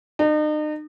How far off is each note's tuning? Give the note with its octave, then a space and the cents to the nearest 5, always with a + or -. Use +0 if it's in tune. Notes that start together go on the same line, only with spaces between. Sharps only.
D#4 -40